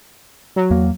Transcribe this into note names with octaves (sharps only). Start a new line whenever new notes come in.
F#3
E2 A#3